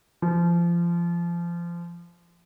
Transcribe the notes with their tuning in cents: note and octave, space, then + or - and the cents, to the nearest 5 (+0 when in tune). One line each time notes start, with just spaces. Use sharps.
F3 -25